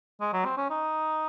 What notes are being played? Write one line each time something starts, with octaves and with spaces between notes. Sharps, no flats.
G#3
F#3
C4
C#4
D#4